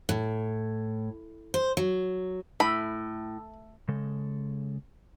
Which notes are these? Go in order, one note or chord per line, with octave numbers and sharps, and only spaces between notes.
A2
C5
F#3
A2 B5
C#3 G#3 A4